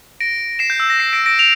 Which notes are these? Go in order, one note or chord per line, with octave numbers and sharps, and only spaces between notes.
A#6 D7
C7 E7
G6
E6
A#6
C7
A#6 D7
A#6 D7
D7 F7